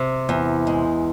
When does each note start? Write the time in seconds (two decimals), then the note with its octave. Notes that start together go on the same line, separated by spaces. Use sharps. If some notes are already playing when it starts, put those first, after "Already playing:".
Already playing: C3
0.29 E2
0.67 G#3